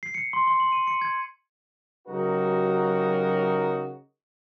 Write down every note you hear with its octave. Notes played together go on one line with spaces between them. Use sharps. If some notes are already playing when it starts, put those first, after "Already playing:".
C7
C#7
C6
C6
F#7
D#7
C#7
G#6
C#3 F#3 D#4 F#4 G4 A#4